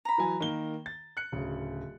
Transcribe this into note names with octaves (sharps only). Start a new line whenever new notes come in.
A#5 B5
E3 F#3 G#5
D#3 A#3 G7
A6
F#6 C#7
D1 C#3